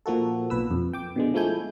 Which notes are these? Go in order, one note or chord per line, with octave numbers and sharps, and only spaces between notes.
A#2 F3 A#3 F#4 A4
B1 A#2 B4 E6
F2
G5 D6
B2 D3 G#3
F3 G#3 A3 E4 G#5 G6